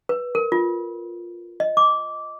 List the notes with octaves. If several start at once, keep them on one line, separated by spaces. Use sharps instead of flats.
B4
A#4
F4
D#5
D6